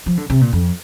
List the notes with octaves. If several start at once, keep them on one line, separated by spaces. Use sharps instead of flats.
F3
D3
C3
A#2
F2